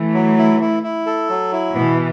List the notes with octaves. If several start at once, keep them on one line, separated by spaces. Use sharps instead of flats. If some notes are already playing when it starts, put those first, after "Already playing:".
Already playing: E3 A3
F#3
E4
E4
E4
A4
F#3
E4
B2 E3 B3